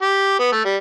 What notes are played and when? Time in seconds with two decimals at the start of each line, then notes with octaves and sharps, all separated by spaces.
0.02 G4
0.40 B3
0.52 A3
0.65 G3